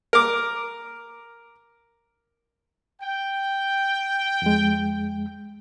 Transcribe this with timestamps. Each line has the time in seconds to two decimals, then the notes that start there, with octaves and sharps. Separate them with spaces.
0.13 A#4 D6
3.02 G5
4.42 F2 G#3